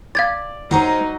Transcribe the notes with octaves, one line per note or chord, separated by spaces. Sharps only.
D5 F5 G#6 A6
F#3 G#3 D#4 A#4 C5